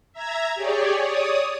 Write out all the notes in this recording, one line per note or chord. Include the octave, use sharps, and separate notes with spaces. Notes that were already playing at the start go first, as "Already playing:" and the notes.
E5 A#5 G#6
G4 G#4 C#5 D5
C#5 D5 D#6